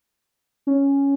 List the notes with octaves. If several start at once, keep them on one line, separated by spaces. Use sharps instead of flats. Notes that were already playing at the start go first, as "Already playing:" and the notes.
C#4